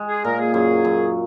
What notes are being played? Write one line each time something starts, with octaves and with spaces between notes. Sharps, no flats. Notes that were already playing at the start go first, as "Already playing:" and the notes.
Already playing: G#3
G#4
A#2 A#4
G#4
F#2 G#4
F#2